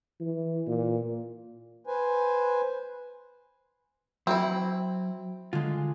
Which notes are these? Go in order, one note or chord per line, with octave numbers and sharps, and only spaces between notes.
E3
A#2
B4 C5 G#5
F#3 C4 E4
D3 G#3 F4